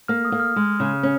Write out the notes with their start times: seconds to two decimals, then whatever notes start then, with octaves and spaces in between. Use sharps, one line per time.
0.08 A#3 F6
0.25 D#6
0.32 A#3
0.40 F6
0.56 G#3
0.80 C#3
1.03 C#4